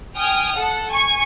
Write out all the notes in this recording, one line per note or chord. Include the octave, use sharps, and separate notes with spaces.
G5 G#5 D#6 F6
A4 F#5
G#5 C#6